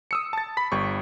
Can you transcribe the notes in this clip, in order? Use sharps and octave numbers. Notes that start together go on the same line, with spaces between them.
D#6 E6 C#7
A5 A6
B5 B6
G1 G3 C#6